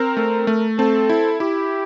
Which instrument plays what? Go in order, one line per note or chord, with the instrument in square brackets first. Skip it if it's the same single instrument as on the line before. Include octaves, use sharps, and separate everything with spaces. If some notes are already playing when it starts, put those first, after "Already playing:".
Already playing: [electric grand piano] C4 [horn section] A#4
[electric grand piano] A3
A3
[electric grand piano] C4 [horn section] A4
[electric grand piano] E4
[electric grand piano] E4 [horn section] G4